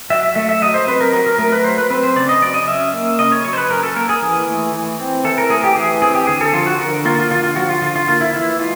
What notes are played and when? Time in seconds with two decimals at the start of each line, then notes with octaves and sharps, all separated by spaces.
0.10 F#3 E5
0.23 E5
0.35 A3 E5
0.49 E5
0.62 F#3 D#5
0.74 C5
0.87 C4 B4
1.01 A#4
1.13 F#3 A#4
1.26 A#4
1.38 A3 A#4
1.52 B4
1.64 F#3 C5
1.78 B4
1.90 C4 B4
2.03 C5
2.16 C#3 D5
2.29 D#5
2.42 F#3 D5
2.54 D#5
2.68 C#4 E5
2.93 A#3
3.19 C#3 D#5
3.32 C#5
3.44 F#3 C#5
3.53 C5
3.57 B4
3.71 C#4 A#4
3.83 A4
3.96 A#3 A#4
4.09 G#4
4.22 E3
4.48 A3
4.74 E3
5.00 C4
5.24 E3 A4
5.38 A#4
5.50 A3 G#4
5.64 G4
5.76 E3 G#4
6.02 C4 G#4
6.15 G4
6.27 D3 G#4
6.41 A4
6.53 F3 F4
6.66 F#4
6.79 D3 A#4
7.05 A#3 F4
7.18 F4
7.30 D3 F4
7.44 F4
7.56 F3 F#4
7.69 F4
7.82 D3 F4
7.96 F4
8.07 A#3 F4
8.21 E4
8.34 E3 E4
8.59 G#3 F4